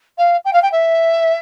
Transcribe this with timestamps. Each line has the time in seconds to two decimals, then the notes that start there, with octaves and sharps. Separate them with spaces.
0.18 F5
0.45 G5
0.53 F5
0.62 G5
0.72 E5